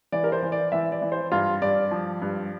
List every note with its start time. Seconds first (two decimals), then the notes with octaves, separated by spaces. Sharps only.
0.12 E3 D5
0.24 A#4
0.32 C5
0.43 E3
0.52 D5
0.72 E3 E5
0.92 D5
1.02 E3
1.12 C5
1.32 G2 F4
1.62 G2 D5
1.91 F3
2.22 G2